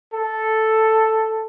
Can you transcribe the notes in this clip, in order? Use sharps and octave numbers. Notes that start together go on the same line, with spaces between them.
A4